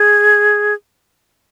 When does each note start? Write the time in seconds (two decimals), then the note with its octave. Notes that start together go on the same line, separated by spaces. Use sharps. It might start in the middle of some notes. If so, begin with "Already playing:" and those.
Already playing: G#4